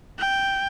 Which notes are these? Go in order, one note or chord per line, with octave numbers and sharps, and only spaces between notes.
G5